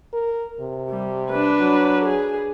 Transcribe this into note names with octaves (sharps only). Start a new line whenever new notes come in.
A#4
C3
G3
D4 B4
F#3
G#4